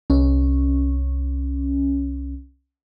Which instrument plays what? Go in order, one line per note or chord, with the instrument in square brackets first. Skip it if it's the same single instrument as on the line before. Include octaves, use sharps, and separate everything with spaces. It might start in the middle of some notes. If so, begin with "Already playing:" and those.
[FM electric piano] C2 C#4